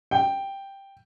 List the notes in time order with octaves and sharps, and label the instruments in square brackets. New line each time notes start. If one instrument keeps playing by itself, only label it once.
[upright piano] G5